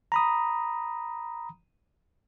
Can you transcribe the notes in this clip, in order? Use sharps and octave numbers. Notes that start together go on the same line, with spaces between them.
A#5 B5 D#6